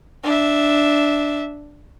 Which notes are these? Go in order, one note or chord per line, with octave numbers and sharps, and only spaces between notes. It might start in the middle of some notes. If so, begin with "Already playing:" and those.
D4 E5